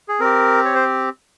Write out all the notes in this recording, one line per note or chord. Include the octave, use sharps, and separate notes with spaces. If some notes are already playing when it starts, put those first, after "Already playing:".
G#4
C4 G4 A#4
C#5
C5